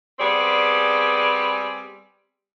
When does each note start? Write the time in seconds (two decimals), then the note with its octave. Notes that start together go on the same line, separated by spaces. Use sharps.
0.20 G3 B3 C4 G#4 D5